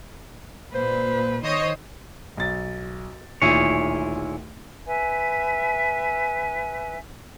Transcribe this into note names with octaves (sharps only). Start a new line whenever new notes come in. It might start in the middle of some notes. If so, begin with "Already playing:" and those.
A#2 B4 C5
D#3 C5 C#5 D#5
B1 A6
D1 A#2 D#3 E4 G#4 C#5
B4 E5 G#5